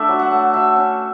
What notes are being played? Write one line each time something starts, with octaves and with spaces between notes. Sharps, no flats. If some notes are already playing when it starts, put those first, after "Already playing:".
Already playing: D3 A3 A4 D5 E5
F#3
F#5
A3
F#3 E5
C#4